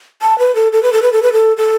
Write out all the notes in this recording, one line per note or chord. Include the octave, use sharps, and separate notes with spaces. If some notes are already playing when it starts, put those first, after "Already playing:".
A5
B4
A4
A4
B4
A4
B4
A4
B4
A4
A4